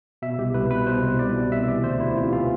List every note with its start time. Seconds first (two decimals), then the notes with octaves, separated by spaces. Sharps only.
0.22 B2 E5
0.38 C2 G4
0.54 C2 B4
0.71 B2 B4
0.87 B2 C5
1.03 C2
1.19 C2 D5
1.35 B2
1.51 C3 E5
1.68 E3 D5
1.84 D2 C5
2.00 D2 E4
2.16 C3 F4
2.32 E3 F4